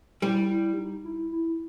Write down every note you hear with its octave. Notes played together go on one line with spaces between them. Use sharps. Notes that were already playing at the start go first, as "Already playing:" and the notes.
G3 E4
E4
D#4
E4
E4